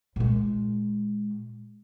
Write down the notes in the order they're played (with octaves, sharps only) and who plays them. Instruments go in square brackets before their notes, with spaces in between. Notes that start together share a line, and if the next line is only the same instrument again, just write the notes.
[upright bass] A#2 G#3